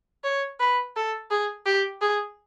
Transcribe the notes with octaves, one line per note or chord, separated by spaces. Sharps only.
C#5
B4
A4
G#4
G4
G#4